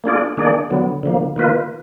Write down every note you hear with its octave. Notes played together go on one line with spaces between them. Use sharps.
A#3 D4 F4 G#4 D5
D#3 A#3 D4 G#4 D5
D3 F#3 B3
D3 F3 A#3
D#3 A#3 F4 B4